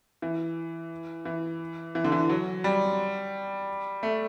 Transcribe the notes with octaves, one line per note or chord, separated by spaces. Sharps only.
E3
E3
E3
D3
E3
F#3
G3
A3